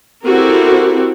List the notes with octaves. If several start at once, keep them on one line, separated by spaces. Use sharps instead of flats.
C4 E4 F#4 G4 A4 A#4